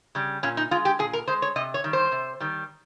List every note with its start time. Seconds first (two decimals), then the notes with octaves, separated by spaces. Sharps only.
0.15 C#3 G3
0.43 A#2 C#4
0.57 D#4
0.71 G#3 F4
0.85 G4
0.99 A#2 G#4
1.13 A#4
1.28 G#3 C5
1.42 C#5
1.56 C3 D#5
1.74 C#5
1.84 D#3 G3
1.93 C5
2.12 C3
2.40 D#3 G3